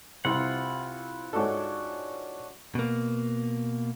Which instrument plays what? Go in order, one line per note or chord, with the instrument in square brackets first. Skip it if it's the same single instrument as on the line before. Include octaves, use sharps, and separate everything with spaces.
[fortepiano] C2 C3 [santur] C4 [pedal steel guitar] F4 F#5
[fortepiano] G#2 A4 [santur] D4 F#4 C#5
[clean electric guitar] B2 A#3